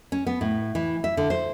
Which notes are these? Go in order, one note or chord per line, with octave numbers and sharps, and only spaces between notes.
C#4
B3
A2
E3
E5
D3
C5